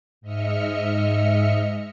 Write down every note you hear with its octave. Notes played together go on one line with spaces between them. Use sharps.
G#2 D#5 E5 F6 C#7